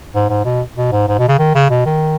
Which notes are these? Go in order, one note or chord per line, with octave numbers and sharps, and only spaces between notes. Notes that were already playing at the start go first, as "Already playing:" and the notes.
G#2
G#2
B2
B2
G#2
G#2
B2
C#3
D#3
C#3
B2
D#3